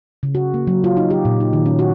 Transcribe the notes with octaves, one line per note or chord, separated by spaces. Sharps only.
C#3
F#4
A#3
F#3
F4
D#4
G4
A#2
D#4
D#3
C#4
F#4